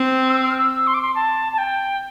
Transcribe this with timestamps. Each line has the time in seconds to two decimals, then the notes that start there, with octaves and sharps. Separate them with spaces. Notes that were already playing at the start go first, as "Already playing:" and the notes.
Already playing: C4
0.29 E6
0.50 F6
0.58 E6
0.87 C6
0.94 D6
1.02 C6
1.15 A5
1.53 A5
1.58 G5